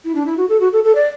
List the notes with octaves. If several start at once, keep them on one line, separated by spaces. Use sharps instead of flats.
E4
D4
E4
F#4
A4
F#4
A4
A4
D5